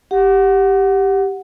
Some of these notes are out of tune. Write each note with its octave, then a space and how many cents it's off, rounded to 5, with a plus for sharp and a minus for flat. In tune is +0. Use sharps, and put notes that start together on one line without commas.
G4 +0 F#5 -5